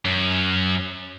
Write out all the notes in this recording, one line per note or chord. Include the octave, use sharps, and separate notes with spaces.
F#2